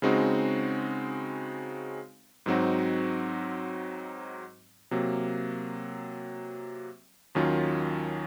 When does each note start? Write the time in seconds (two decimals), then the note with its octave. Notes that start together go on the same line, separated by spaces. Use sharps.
0.02 C#3 G#3 C4 D#4 F#4
2.46 G#2 F#3 C4 D#4 F#4
4.91 C3 F#3 A#3
7.35 D#2 D#3 F#3 C#4 F4